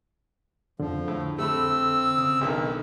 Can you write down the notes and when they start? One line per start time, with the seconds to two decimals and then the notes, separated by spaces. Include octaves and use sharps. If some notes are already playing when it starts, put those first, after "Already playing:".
0.80 F2 D3 F3
1.08 A2
1.39 A3 C4 B5 E6
2.18 C#3 D#6
2.41 B1 D3 D#3